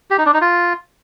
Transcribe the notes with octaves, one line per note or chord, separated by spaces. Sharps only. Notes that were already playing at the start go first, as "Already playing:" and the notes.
G4
D#4
D4
D#4
F4